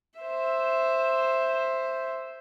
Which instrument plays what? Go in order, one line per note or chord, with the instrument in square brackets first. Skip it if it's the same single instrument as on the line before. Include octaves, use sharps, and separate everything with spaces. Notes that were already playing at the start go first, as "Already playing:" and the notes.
[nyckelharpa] C5 E5